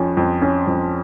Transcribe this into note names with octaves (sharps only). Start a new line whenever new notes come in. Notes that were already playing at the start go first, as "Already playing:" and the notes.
Already playing: F2 F3 C#4
F2
C#4
F2